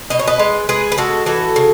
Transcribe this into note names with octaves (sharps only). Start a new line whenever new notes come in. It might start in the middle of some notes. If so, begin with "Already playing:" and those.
B2 D#5
C#5
B4 D#5
G#3
G#3 G#4 B4
B4
G#3 F#4 A4
E3 F#4 A4
C#3